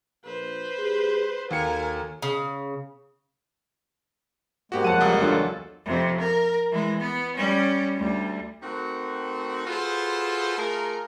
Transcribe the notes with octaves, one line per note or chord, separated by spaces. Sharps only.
A#1 B4 C5
G#2 G4 G#4
D#2 F#4 A4 A#4 G#5 C#7
C#3
G#2 G#3 A#3 B3 F#4 G4
F2 F#3 F#5 A5 D#7
C#2 G3 D#6
E2 F#3 D4 F4 A4
F2 C3
A#4
E3 G#3
B3
G3 C#4
D2 G3
D#3 A3 C4 F#4
F4 F#4 G#4 A4 B4 C5
A3 F4 G#4 A#4